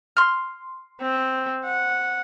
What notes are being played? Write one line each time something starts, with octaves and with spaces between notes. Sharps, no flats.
C6 F6
C4
F#5